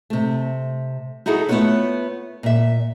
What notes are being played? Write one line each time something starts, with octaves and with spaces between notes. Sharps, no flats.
C3 A3
D#4 E4 F#4 G#4 A4
A3 B3 C#4 F4 B4 C#5
A#2 E5